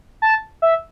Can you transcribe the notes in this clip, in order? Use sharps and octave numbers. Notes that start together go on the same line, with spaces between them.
A5
E5